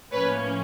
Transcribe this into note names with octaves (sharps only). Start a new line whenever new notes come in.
A2 F3 A#3 C#4 B4 C#5